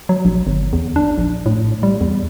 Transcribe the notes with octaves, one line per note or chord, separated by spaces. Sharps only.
F#3
A#1
G1
E2
D4
A#1
A2
G3
E2